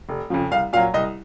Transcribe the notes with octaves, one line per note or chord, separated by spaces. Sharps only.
F1
F2 C#3 F3
C2 F5
A#2 F#3 F5
C2 D#5